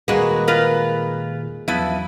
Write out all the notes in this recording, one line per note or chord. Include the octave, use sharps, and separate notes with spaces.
D#1 D#2 G#3 A#3 F#4 B4
F4 A#4 B4
E2 F3 F#3 B3 E4